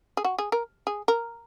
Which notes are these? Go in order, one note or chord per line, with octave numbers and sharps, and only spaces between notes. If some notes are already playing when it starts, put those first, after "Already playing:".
G#4
F#4
G#4
A#4
G#4
A#4